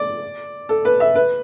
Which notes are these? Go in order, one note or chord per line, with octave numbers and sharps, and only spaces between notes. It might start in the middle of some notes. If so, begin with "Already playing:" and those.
Already playing: D5
A4
B4
E5
B4